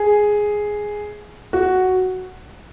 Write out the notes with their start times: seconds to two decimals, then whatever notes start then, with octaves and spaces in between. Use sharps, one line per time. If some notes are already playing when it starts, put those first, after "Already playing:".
Already playing: G#4
1.53 F#4